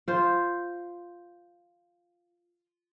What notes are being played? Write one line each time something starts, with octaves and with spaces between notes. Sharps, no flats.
F4 C5